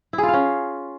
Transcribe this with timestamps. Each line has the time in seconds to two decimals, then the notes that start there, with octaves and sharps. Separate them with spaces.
0.13 E4
0.18 G#4
0.23 F4
0.28 F5
0.33 C#4